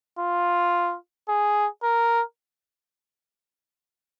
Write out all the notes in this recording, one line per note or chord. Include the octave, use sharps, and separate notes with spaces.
F4
G#4
A#4